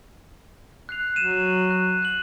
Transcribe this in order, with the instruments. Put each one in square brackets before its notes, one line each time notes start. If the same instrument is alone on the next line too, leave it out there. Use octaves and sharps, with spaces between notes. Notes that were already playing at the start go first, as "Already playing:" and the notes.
[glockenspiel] F#6 C7 F7
[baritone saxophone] F#3 [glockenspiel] D#7 E7
[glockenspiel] F#6
F#6 F#7